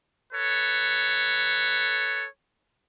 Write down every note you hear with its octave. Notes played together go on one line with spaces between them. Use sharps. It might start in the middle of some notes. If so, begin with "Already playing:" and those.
A4 B4 C#5